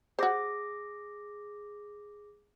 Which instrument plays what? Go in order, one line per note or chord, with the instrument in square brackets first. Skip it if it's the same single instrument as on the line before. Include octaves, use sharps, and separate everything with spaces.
[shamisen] F#4 C5 [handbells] G#4 D6 A#6